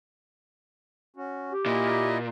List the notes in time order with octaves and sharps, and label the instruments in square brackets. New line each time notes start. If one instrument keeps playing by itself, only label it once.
[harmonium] C#4 F#4
[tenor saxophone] G4
[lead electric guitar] A#2 [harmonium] E4 D#5